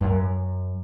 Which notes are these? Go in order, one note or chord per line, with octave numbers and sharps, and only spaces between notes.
F#2